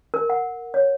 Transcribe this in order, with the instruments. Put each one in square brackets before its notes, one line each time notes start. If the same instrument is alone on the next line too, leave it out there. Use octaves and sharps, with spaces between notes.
[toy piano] A#4
F#5
C#5